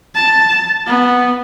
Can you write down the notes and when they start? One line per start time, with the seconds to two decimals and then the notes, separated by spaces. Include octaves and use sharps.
0.15 A5
0.87 B3